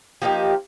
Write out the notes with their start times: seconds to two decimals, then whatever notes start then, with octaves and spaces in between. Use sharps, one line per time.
0.22 F3 A#3 D#4 G4